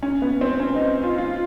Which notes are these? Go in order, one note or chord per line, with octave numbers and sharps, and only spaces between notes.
C#4
B3
C4
C#4
D#4
F4
F4